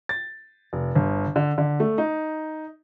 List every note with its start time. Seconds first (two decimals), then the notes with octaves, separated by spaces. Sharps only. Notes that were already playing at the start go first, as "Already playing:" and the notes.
0.09 A6
0.73 F1
0.95 G1
1.36 D3
1.58 D3
1.80 A3
1.98 D#4